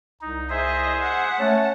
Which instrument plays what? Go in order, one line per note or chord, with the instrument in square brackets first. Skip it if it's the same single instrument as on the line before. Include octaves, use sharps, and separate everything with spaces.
[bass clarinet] C2 [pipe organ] D#4
[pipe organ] G#4 C5 E5 [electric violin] D#5
[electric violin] F#5
[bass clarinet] A3 [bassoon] C#4 [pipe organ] A5